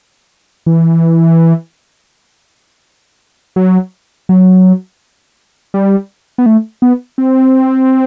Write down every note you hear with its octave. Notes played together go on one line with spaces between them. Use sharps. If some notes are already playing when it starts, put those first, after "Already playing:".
E3
F#3
F#3
G3
B3
A3
B3
C4